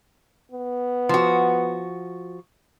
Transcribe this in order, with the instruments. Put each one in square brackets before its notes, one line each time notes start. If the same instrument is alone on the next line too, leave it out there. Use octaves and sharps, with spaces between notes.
[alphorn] B3
[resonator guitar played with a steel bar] F3 F#4